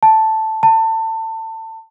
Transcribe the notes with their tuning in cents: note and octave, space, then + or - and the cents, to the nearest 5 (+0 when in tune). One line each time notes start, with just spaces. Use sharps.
A5 +0
A5 +25